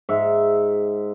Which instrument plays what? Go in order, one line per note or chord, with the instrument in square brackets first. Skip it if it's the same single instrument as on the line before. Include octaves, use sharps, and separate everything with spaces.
[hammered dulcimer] G#2 E5